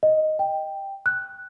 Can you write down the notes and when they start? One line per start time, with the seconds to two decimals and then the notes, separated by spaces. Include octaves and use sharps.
0.03 D#5
0.39 G5
1.06 F#6